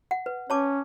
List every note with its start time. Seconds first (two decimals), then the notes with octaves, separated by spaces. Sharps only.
0.11 F#5
0.26 B4
0.50 C#4 C#5 A5 D6